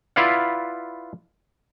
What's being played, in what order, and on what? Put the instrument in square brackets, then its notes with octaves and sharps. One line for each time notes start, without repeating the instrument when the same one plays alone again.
[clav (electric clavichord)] E4 F4 B4 D5 F5 F#5